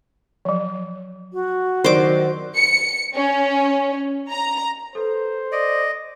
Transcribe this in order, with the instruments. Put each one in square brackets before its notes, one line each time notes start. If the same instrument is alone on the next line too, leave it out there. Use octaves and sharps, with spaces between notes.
[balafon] F3 F#3
[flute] F#4
[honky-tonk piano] D#3 F#3 D5 [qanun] C5 D6 [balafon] C#6
[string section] C#7
C#4
A#5
[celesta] A4 B4 [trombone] C5
[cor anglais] D5 [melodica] D#5